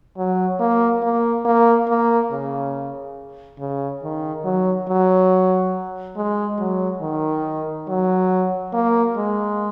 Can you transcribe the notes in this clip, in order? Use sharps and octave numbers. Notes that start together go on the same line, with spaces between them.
F#3
A#3
A#3
A#3
A#3
C#3
C#3
D#3
F#3
F#3
G#3
F#3
D#3
F#3
A#3
G#3